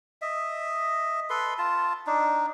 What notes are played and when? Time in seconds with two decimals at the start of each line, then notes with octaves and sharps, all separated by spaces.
0.22 D#5 E5
1.30 A4 B4 C6
1.58 F4 A5
2.07 D4 D#4